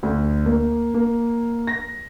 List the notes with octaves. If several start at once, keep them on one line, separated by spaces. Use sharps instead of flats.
D2
A#3
A#3
A#6